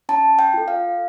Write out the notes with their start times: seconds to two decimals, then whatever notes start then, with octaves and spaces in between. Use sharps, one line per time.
0.09 C#4 A5
0.39 G5
0.54 F4 A4
0.68 F5